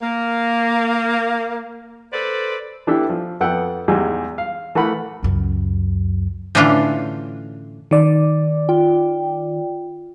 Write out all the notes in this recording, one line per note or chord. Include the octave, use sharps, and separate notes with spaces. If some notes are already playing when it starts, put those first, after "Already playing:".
A#3
A4 B4 C5 D5
E3 D4 E4 G4 A4 E5
F3
F2 B3 A4 F#5 G5 E6
E2 G#2 G3 G#3
F5
E3 A3 A#4 F#5 B5
C#2 F#2
A2 D3 E3 C#4 D4 F4
D#3 D5
F4 G5